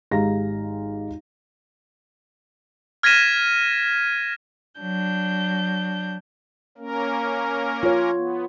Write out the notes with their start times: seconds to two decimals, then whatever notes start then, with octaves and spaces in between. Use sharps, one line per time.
0.11 G#1 G#3 G4 F5 A#5 A#6
3.03 F6 G#6 A#6 B6 D#7 E7
4.78 F#3 D4 G6
6.78 A#3 C#4 A#4
7.83 F4 C#5
8.13 B3